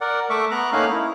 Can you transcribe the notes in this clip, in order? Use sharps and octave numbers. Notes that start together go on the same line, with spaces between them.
A#4 D5 F#5
A3 E5 C#6 D6
B3 A#5 F#6
A3 A#3 C#4 D#4 F5 F#6
E4